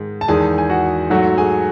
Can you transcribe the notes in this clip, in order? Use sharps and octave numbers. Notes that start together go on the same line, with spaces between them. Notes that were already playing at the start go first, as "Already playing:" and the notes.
Already playing: G#2 D#3 G#3
A5
E2 D#3 G#3 G#4 G#5
G#5
F#4 F#5
G#2 F#3 A3 F#4 F#5
G#4 G#5